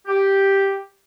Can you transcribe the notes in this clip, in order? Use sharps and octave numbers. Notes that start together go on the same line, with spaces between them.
G4